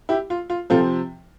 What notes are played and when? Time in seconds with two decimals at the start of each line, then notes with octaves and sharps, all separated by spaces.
0.09 E4 G4
0.30 F4
0.50 F4
0.70 C3 F3 C4 F4 A4